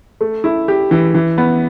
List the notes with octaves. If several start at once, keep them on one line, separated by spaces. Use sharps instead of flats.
A3
E4
G4
E3
E3
B3